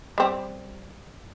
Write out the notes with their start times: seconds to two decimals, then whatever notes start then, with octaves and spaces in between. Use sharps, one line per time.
0.18 G3 C4 G4